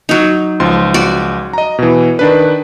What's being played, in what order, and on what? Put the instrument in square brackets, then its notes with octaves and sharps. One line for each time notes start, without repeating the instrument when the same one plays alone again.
[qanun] F#3 D#4
[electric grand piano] C#2 F3 C6
[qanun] F#4 D5
[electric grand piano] D#5 A#5
B2 E3
D#3 D4 B4